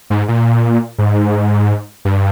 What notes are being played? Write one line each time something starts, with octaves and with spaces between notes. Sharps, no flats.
G#2
A#2
G#2
G2